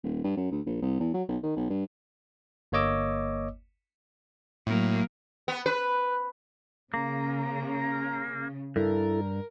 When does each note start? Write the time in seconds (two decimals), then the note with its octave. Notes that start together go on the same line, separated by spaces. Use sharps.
0.04 D#1
0.24 G2
0.37 F#2
0.52 D2
0.66 A#1
0.82 C2
1.00 E2
1.14 F#3
1.28 B1
1.43 D#3
1.56 B1
1.70 G2
2.72 G1 A#3 C#5 D#5 D6 E6
4.67 A2 F#3 A#3
5.48 B3
5.66 B4
6.94 C#3 A#3 A#5
8.76 G2 E4 A4 A#4